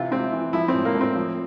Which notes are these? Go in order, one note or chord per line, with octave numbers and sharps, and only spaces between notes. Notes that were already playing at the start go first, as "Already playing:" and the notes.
Already playing: C3 E3 F4
C3 C4
E3
F3 E4
C4
A2
A#3
A2
C4
F3